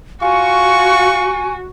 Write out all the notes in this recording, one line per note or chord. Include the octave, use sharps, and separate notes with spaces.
F4 F#4 G#5 C#6